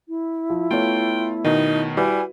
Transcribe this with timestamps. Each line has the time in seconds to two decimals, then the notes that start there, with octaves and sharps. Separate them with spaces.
0.09 E4
0.50 F3
0.71 A3 B3 F4 C#5 G5
1.44 B2 D#3 D#4
1.97 G3 E4 F#4 B4 D5 G#5